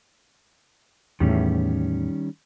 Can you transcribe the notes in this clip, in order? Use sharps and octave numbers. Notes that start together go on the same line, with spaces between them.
E2 A2 D#3 G3 C#4